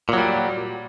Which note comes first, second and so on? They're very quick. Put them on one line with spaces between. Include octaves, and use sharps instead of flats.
A#2 F#3 G3